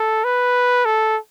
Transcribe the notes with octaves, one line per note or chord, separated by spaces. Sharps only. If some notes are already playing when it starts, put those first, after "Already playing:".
Already playing: A4
B4
A4